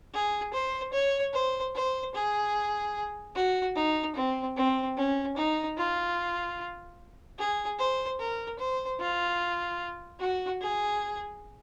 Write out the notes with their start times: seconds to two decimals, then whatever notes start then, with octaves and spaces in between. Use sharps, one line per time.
0.14 G#4
0.54 C5
0.93 C#5
1.34 C5
1.75 C5
2.15 G#4
3.35 F#4
3.76 D#4
4.16 C4
4.57 C4
4.97 C#4
5.37 D#4
5.77 F4
7.39 G#4
7.79 C5
8.20 A#4
8.59 C5
9.00 F4
10.20 F#4
10.61 G#4